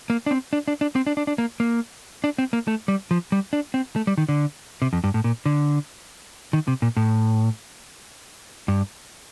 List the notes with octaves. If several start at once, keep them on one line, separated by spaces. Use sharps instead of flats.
A#3
D4
C4
D4
D4
D4
C4
D4
D4
D4
A#3
A#3
D4
C4
A#3
A3
G3
F3
G3
D4
C4
A3
G3
D#3
D3
C3
F2
G2
A2
A#2
D3
D#3
C3
A#2
A2
G2